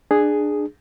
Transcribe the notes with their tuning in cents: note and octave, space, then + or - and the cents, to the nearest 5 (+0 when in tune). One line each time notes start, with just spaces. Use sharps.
D4 +20 G#4 +0